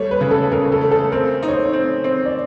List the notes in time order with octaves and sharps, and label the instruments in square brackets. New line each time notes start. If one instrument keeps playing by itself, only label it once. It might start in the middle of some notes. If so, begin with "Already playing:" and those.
Already playing: [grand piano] G3 A3 [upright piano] C#5
[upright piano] B4
[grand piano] C#3
[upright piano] A4
[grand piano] C#3 [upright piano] A#4
[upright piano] A4
[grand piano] A3
[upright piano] A4
[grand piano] C4 [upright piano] A#4
[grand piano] D#4
[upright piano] C#5
C5
[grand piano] C4
C4
[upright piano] D5